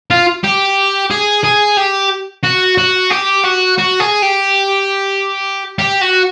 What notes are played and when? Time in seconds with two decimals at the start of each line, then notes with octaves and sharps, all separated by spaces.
0.10 F4
0.43 G4
1.10 G#4
1.44 G#4
1.77 G4
2.44 F#4
2.78 F#4
3.11 G4
3.44 F#4
3.78 F#4
4.00 G#4
4.22 G4
5.79 G4
6.01 F#4